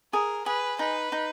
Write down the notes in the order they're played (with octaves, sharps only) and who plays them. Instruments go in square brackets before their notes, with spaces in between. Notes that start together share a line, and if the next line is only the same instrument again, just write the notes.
[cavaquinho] G#4 [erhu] A#4
[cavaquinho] G#4 [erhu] B4
[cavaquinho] D#4 [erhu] B4
[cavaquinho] D#4